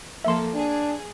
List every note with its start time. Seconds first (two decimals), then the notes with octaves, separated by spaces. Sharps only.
0.25 F3 A#3 A4 E5 C6
0.55 D4 G#4